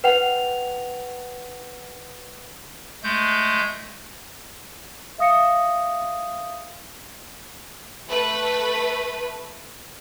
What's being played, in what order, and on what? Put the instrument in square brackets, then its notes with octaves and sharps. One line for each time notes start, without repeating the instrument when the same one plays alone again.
[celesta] B4 F#5 G5 F7
[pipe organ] G#3 A3 G6
[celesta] E5 F5 D#6 A#6 C#7
[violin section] A3 B4